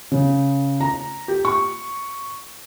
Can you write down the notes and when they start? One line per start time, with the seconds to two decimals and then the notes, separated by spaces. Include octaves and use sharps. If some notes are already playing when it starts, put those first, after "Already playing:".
0.12 C#3
0.81 A#5
1.28 G4
1.45 C#6